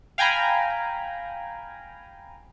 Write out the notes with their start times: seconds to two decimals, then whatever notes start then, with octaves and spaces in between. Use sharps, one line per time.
0.18 F5 G5 G#5 A#5 B5